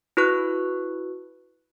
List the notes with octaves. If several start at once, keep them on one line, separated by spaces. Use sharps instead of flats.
E4 F#4 B4 C#6 F#6